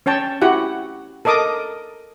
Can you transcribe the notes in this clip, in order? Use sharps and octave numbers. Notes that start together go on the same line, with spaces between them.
C#4 C#5 G5 A5
E4 F#4 G4 F#5
A4 A#4 D#5 D6 D#6